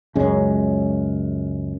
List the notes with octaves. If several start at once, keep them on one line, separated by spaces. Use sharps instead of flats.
C#2 F#2 G#3 C#4